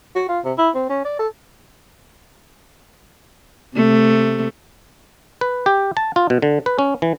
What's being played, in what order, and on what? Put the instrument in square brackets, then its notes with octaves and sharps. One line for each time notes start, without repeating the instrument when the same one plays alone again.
[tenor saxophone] F#4
F4
C3
E4
C4
C#4
D5
A4
[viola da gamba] C3 A3
[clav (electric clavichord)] B4
G4
A5
F4
B2
D3
B4
C#4
E3